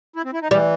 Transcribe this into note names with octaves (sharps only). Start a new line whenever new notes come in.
E4
C4
E4
D#4
E3 G3